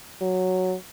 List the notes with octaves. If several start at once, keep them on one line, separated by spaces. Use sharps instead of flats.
F#3